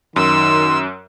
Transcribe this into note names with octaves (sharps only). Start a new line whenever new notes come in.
F#2 D#3 C6 E6